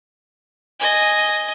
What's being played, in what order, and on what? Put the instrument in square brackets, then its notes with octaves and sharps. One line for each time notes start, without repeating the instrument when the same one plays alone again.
[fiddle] D#5 G#5